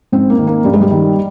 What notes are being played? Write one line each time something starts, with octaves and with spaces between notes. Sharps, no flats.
G#2 C4
A#3
D#3
A#3
G2 G3
G#3
G3
D#3